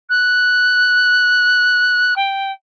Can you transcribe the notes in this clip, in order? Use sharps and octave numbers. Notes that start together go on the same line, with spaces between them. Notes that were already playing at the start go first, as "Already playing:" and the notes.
F#6
G5